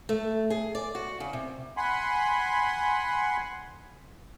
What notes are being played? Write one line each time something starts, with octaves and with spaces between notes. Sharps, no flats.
A3
G#4
D5
F#4
C#3
C3
F#5 G#5 B5 C6